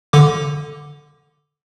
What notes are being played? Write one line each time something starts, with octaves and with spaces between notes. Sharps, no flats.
D3 D6